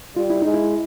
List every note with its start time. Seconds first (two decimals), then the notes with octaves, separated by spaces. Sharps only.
0.16 G3 F4
0.30 E4
0.42 G#3 D#4
0.54 E4